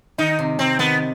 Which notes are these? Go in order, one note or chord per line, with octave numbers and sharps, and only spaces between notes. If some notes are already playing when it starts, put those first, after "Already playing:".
D#3 D#4
C3
C3 C4
D#3 B3